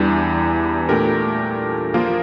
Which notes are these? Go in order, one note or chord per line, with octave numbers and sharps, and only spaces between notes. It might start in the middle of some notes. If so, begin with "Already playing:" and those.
Already playing: E2 E3 G3 D4
A#2 A3 D4 G4 A#4
F3 A#3 F4 A#4